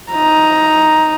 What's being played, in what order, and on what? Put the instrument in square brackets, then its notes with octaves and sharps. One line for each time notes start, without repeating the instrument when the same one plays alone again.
[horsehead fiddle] D#4 A#5